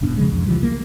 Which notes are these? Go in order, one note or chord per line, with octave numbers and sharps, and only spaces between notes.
D#1 G2 B2 D4
C#3 F3 G#3
C2 F2
C#3 E3 F3 G3
A#3